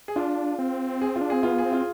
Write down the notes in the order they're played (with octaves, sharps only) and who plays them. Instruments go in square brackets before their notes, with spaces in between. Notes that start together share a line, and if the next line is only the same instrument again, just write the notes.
[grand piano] G#4
[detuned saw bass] D4 [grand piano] F4
[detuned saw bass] C4
[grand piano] G#4
F4
[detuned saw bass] D4
[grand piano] G#4
[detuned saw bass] C4
[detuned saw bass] B3 [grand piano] F4
[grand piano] G#4
[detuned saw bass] C4
[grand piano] F4